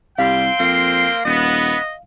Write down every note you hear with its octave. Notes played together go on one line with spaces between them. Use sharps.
C2 G3 C4 F5 G5 C6
F2 A#3
D#1 B3 D#5